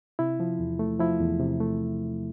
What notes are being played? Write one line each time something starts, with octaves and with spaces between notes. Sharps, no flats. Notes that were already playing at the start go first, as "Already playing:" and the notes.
C3 E4
F3
E2
A3
F3 E4
E2
C3
A3